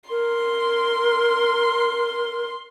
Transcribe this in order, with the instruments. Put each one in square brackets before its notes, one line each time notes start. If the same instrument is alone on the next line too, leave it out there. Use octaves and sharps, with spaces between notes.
[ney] A#4 [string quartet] C6